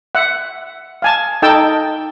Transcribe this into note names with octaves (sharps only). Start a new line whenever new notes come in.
E5 F#5
F5 G#5 A5
D#4 A4 G5 A5 E6